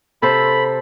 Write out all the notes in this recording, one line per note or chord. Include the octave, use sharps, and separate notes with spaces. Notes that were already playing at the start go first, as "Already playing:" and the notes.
C3 A4 C5 B5